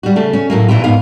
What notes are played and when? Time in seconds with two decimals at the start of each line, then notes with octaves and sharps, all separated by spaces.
0.03 G3 F#4
0.16 C#3 A3
0.33 C#4
0.50 A2 F#3 A#3
0.69 F2 A#2 D3 E3 E4 F4
0.84 D2 G#2 B3 F5